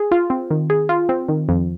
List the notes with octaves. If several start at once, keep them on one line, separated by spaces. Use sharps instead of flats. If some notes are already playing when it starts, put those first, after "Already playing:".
Already playing: G#4
F4
C4
D#3
G#4
F4
C4
D#3
F2